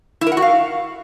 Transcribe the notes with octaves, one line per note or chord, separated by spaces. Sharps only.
E4
A#4
F#5
F#4
F5